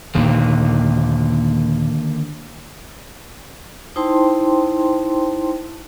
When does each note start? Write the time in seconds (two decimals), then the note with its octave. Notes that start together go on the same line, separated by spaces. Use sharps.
0.15 D#2 A#2 D3 D#3 A#3
3.96 D#4 E4 C5 G5 A5 C6